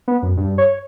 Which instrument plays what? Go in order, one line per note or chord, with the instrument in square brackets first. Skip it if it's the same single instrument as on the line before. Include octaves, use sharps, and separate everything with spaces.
[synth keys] B3
F#2
G2
C#5